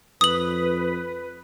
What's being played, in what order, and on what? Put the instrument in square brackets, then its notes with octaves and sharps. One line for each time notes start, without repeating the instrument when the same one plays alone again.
[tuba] F2 [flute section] B4 [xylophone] D#6 F#7